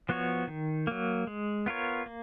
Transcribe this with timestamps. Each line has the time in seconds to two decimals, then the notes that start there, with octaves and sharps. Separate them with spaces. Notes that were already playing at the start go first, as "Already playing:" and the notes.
0.09 F3 B3 F#4 C#5
0.48 D#3
0.87 F#3 A#3
1.27 G#3
1.66 B3 F4 A#4 C#5
2.06 A#3